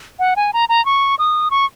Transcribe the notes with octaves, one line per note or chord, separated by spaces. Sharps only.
F#5
G#5
A#5
A#5
C#6
D#6
C#6